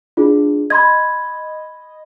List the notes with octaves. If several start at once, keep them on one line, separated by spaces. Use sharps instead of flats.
D4 F4 G#4
D#5 B5 C6 G#6